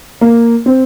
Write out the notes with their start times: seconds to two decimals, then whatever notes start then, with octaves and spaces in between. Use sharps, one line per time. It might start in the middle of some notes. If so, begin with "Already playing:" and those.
0.21 A#3
0.66 C4